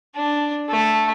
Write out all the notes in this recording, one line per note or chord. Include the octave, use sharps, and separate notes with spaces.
D4
A3